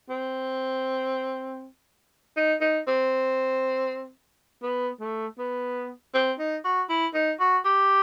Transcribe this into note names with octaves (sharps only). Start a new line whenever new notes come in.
C4
D#4
D#4
C4
B3
A3
B3
C4
D#4
F#4
E4
D#4
F#4
G4